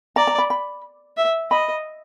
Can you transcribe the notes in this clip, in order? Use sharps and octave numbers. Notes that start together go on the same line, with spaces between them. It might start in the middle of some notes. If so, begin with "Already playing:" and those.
D5 A#5
A#5
B5
B5
E5
D#5 B5